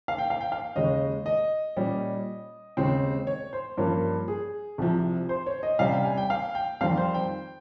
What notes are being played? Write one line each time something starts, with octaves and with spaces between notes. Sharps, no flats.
F5
G5
F5
G5
F5
D#2 C#3 G#3 D#5
D#5
A#2 G3 C#4
D#2 C#3 G#3 C4
C#5
C5
G2 F3 A#3 C#4
G#4
C2 C3 F3
C5
C#5
D#5
C3 G3 C#4 F5
G5
G#5
G5
F5
G5
F2 D#3 G3 C4 F5
C5
G5